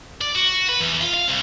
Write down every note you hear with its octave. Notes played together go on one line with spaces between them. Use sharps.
D5
F#4
B4
E2
F4
F5
C2